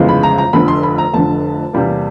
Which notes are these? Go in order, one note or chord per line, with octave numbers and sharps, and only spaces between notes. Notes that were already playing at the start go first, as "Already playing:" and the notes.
Already playing: G1 F2 C#3 E3 G#3
B5
A#5
A#5
F1 F2 D3 B5
C6
B5
A#5
F1 F2 D3 A5
E2 C3 E3 G3 A#3